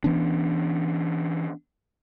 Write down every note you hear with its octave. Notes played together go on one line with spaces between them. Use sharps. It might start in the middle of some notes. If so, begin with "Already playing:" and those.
E3 B3 C#4 D4